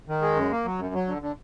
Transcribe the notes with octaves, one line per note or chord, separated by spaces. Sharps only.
D#3
G#3
F#2
A#3
F#3
F#2
F#3
D3
D3